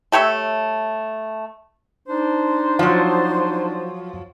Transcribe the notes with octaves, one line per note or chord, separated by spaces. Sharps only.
A3 G4 C#5 E5
D4 D#4 C5
F3 F#3 F5